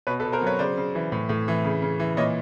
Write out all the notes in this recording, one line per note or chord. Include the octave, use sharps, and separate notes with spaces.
B2 B4 C#5
A4 B4
B2
A#4 C5
F#3
B4 C#5
C#3 C5 D5
C#3
E3
A2
A2
E3
C#3
C#3
E3
A#2 C#5 D#5